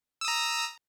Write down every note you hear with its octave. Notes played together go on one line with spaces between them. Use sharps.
A#5 D#6 E6